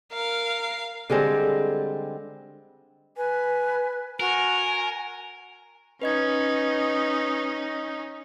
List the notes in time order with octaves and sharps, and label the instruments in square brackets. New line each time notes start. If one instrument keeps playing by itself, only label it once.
[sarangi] A#4 [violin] F5
[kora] D3 G3 G#3 C4
[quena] B4 [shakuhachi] G#5
[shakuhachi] F#4 [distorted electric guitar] A#4 [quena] G#5
[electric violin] C#4 D#4 [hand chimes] B4 D#5 G#6